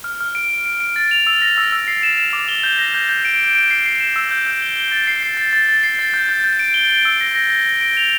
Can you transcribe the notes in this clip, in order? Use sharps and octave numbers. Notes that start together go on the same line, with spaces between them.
F6
F6
D7
D7
D7
D7
A6
F7
E6
A#6
E6
E6
C7
E7
E7
D6
G7
G6
A#6
G6
G6
D7
D7
D7
C7
C7
E7
E6
G6
G6
G7
G7
A6
C7
C7
A6
A6
A6
C7
A6
G6
G6
G6
D7
G7
D7
E6
A#6
A#6
A#6
A#6
D7
F7